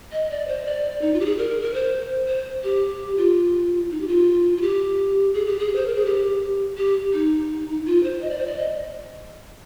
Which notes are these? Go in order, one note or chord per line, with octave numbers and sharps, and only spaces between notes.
D#5
D5
C5
D5
D#4
F4
G4
G#4
A#4
A#4
C5
C5
G4
F4
D#4
G4
F4
F4
G4
G#4
G4
G#4
C5
A#4
G#4
G4
G4
D#4
F4
C5
D#5
D5
C5
D5
D#5